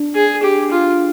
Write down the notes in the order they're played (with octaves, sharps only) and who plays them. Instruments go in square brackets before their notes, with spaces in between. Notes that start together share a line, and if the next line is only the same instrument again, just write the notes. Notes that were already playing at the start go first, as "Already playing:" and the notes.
Already playing: [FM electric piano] D4
[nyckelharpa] G#4
G4
F4